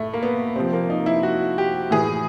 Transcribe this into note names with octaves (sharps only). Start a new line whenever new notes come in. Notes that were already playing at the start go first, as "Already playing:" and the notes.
Already playing: A2 A3
A#3
B3
C3 F3 C4
A#3
D#4
E4
F#4
G4
A2 E3 G#4